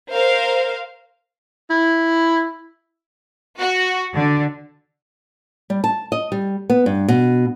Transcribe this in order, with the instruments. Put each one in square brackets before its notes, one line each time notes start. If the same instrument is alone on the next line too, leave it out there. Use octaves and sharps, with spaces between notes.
[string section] A#4 C5 F5
[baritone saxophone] E4
[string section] F#4
D3
[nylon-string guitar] G3
A5
D#5
G3
B3
G2
B2